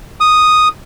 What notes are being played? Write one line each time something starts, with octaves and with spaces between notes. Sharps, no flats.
D#6